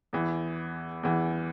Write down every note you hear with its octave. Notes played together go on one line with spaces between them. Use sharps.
E2 E3
E2 E3